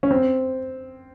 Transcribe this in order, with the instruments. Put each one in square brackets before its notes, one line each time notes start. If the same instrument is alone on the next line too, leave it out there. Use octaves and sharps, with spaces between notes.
[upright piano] C#4
C4